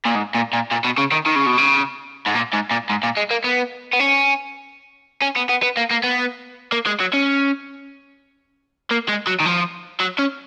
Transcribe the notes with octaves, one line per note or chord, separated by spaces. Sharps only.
A#2
G#2
A#2
A#2
A#2
B2
C#3
D#3
D#3
C#3
B2
C#3
G#2
A#2
G#2
A#2
G#2
A#2
G#3
A#3
B3
B3
C#4
C#4
B3
B3
B3
A#3
A#3
B3
A#3
G#3
F#3
C#4
A#3
G#3
F#3
D#3
F3
F#3
C#4